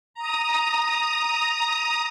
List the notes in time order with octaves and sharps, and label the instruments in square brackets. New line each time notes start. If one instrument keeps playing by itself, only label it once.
[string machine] A#5 D#6